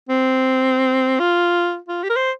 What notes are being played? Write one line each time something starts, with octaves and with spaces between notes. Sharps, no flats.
C4
F4
F4
G4
A#4
C5